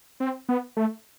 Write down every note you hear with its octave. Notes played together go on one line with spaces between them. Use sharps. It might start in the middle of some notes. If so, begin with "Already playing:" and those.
C4
B3
A3